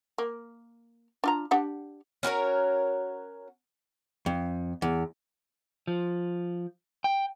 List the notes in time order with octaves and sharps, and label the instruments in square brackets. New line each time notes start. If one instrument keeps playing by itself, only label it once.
[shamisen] A#3
D4 F4 A#5
D4 G4 F#5
[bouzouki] C#4 F#4 A#4 C#5
[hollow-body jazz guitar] F2
E2
[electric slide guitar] F3
G5